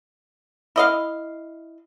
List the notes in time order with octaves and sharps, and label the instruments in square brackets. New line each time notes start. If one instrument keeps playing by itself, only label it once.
[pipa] E4 D#5 F5